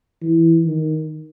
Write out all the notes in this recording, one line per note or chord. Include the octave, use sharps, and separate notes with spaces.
E3
D#3